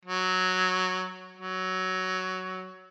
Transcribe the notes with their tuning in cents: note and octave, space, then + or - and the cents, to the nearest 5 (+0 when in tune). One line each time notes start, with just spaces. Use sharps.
F#3 +0
F#3 +10